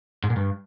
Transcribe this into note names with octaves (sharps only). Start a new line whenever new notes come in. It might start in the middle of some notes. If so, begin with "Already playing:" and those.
G#2
A#2
G2